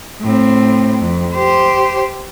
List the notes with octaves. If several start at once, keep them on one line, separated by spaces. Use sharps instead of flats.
A2 C4
F2
G4 C5